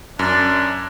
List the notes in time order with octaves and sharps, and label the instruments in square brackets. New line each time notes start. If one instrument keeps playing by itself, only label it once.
[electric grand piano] F#2 [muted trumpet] D4